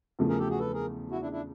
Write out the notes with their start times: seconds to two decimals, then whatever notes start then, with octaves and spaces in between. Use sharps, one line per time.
0.19 E2 C#3 F3 A3
0.28 G#4 A#4
0.39 G4 A4
0.50 F#4 G#4
0.59 A4 B4
0.73 G#4 A#4
1.11 E4 F#4
1.22 D4 E4
1.32 D4 E4